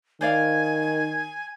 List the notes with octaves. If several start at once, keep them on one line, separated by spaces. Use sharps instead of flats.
D#3 C5 D5 F5 G#5